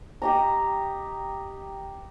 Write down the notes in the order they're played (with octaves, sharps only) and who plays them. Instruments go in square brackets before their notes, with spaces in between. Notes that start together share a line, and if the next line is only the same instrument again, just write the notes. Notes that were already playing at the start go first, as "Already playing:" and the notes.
[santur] G4 D#5 A#5